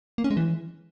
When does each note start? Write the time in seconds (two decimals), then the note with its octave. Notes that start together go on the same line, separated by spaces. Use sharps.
0.18 A#3
0.24 C#4
0.31 G#3
0.37 E3